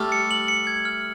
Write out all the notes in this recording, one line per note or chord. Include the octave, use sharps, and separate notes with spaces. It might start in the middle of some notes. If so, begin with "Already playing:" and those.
Already playing: G3 A3 F6
C#7
F#7
C#7
G#6
F6